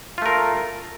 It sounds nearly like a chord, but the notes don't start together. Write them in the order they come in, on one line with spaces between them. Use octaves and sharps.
F4 A3 A#4